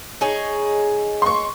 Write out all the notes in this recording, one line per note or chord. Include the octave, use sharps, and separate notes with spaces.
D#4 G#4 C#5
C6 C#6